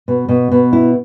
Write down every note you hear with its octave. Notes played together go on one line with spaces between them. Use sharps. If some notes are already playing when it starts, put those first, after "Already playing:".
B2
B2
B2
E4